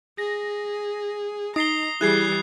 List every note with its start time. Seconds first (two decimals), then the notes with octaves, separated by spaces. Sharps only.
0.18 G#4 A#6
1.56 D#4 A#5 D#6 C7 G7
2.01 E3 G3 E4 G#4 F#6 G#6 C7